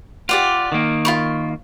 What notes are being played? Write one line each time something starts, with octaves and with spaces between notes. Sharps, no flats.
F4 G4 D5 F#5
D#3 A#3
F4 B5 C#6